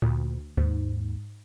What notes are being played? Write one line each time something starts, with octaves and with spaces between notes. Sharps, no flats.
D2 A#2
D#2 G#2